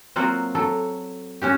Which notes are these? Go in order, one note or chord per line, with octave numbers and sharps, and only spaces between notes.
F#3 A#3 C4 F4 F#4
F#3 A4
C#4 F#4 G4